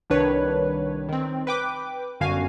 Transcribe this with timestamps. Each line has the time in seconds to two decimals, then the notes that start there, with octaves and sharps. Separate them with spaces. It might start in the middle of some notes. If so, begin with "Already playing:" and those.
0.10 C2 D#3 D4 B4 C#5
1.09 D#3 C4
1.47 B4 G5 D6
2.20 G1 F#2 D3 F#4 F5 G#5